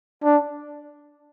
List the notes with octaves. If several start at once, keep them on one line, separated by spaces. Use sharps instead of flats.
D4